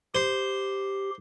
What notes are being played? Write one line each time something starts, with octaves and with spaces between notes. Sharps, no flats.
G4 C5